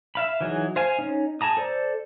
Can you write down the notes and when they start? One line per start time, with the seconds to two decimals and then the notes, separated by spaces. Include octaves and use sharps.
0.15 E5 F5 B5
0.41 E3 F#3 D#4 G#4
0.76 C5 F5 G#5
0.99 C#4 D#4
1.41 G#4 A5 A#5 D#6
1.57 A4 C5 D5